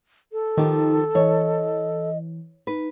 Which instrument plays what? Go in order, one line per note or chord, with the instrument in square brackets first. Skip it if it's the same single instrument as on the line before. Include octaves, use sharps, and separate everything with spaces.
[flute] A4
[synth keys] D#3 [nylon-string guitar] F3 G4 [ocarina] D#4
[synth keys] E3 [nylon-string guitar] C#5 [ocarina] D#5
[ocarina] D#4 [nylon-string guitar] B4